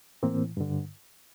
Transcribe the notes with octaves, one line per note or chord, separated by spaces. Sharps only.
A2 E3 A#3 C4
G2 D3